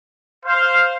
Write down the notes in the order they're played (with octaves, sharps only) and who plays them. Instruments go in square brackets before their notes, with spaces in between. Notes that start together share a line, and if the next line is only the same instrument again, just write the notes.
[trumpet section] C5 F5